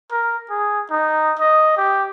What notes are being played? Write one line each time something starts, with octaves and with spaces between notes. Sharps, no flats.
A#4
G#4
D#4
D#5
G4